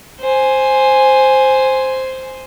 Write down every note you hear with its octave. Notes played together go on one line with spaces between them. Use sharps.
C5 G#5